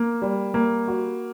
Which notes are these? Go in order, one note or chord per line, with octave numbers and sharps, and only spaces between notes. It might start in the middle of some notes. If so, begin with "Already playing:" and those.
Already playing: A#3
G3
A#3
F#4